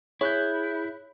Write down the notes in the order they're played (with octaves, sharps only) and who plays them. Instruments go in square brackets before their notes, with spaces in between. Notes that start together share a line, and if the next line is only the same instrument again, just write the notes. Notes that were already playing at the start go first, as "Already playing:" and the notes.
[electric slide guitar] E4 [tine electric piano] G#4 F#6 G6 [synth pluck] C#5